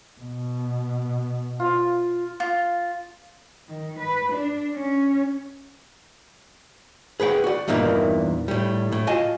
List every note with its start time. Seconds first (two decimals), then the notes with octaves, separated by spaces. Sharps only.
0.20 B2
1.60 F4
2.40 F4
3.69 D#3
4.00 B4
4.33 D4
4.75 C#4
7.20 G#4 B4 F#5 G5
7.44 F#4 D5
7.68 E2 G2 A#2 E3 A#3 D#4
8.48 A2 G3
8.92 A2
9.07 F4 D#5 G#5 A5